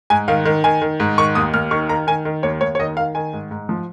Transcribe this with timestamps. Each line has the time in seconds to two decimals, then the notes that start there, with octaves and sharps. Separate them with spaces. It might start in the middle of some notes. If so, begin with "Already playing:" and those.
0.10 G#2 G#5
0.28 D#3 F5
0.45 D#3
0.64 D#3 G#5
0.82 D#3
1.00 G#2
1.18 D#3 C#6
1.35 D#2 D#6
1.54 D#2 F6
1.71 D#3 C#6
1.89 D#3 A#5
2.07 D#3 G#5
2.25 D#3
2.43 D#2 C#5
2.61 D#2 C#5
2.75 C#5
2.79 D#3 D#5
2.97 D#3 F5
3.15 D#3 G#5
3.33 G#2
3.51 G#2
3.69 F3